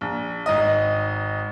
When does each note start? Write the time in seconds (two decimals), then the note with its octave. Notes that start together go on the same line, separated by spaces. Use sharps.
0.01 A#1
0.46 G#1 D#4 D#5